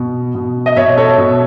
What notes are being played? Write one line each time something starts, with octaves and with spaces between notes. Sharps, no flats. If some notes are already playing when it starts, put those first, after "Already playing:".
Already playing: B2
B2
D#5
B2 C#5 E5
A4 C#5
B2